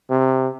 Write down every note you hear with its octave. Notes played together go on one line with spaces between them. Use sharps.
C3